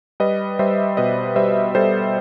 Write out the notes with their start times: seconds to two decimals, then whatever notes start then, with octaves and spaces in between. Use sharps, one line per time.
0.20 G3 B4 D#5
0.59 G3 C5 E5
0.97 B2 B4 D#5
1.36 G3 C5 E5
1.75 G3 A4 C5